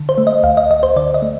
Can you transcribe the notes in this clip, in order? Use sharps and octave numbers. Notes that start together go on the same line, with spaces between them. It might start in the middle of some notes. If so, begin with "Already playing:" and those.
Already playing: D3
C5
A3
D#5
D2 F5
D#5
D2 D#5
C5
D3 D5
D#5
A3